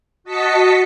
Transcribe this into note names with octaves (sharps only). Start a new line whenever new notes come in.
F#4 D#5 A5 B6 C#7